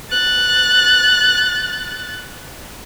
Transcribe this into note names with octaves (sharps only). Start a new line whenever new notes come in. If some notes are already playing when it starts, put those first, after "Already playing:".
F#6 A6